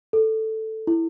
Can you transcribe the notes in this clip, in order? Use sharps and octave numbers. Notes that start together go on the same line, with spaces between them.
A4
E4